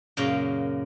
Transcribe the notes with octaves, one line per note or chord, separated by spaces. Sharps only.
F#2 A#2 C#3 F5